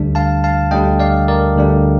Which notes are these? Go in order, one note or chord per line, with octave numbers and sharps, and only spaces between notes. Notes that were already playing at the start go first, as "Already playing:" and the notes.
Already playing: D2 D3 G3 D4
F5 A5
F5 A5
D2 D3 G3 D4 D#5 G5
D5 F5
A#4 D5
D2 D3 G3 D4